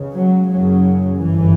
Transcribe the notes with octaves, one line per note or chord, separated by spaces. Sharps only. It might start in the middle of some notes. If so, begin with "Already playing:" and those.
Already playing: C#2 C#3
F#3
F#1 F#2 C#3 F#3
G1 F#2 E3